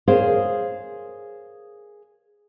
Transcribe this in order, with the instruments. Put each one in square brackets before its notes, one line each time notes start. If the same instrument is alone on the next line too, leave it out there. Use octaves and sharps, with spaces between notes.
[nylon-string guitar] G#4 A#4 C5 C#5 F5